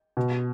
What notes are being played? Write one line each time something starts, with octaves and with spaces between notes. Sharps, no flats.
B2